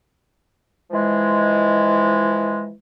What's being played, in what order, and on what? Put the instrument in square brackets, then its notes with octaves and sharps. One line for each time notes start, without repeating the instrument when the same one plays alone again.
[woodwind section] E3 F3 G#3